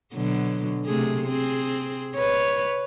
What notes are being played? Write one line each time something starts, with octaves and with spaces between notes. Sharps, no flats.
B2 D3 F#3
C3 A3 G#4
C4 G#4
B4 C#5